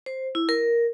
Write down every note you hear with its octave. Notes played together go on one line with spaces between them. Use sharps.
C5
E4
A#4